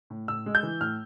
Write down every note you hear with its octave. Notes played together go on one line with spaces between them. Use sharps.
A2
A2 E6
G#3
G6
E3
A2 F6